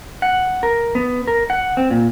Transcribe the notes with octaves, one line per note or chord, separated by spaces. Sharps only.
F#5
A#4
B3
A#4
F#5
C4
A#2